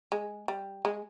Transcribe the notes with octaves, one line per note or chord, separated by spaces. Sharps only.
G#3
G3
G#3